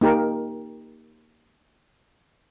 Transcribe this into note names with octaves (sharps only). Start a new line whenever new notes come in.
A#3 D#4 G4 A#4